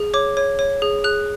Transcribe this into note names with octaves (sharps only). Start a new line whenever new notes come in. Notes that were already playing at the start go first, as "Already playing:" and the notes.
Already playing: G#4
C#5 D6
C#5
C#5
G#4
G#4 F#6